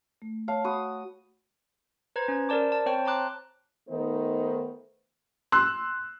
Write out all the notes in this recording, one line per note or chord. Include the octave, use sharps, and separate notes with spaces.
A3
C#5 F5 A5
F#4 B5 D#6
B4 C5 A#5 G#6
C#4
A#4 C5 D5 A5 D6
A5
C4 C5 C#5 G5 A5
A5 A#5 C6 D6 F#6
D#3 A3 B3 D#4 C5
C6 E6 F#6